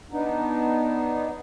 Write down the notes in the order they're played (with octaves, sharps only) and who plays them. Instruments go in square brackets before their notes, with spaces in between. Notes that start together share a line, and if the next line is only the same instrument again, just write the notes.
[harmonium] B3 D4 D#4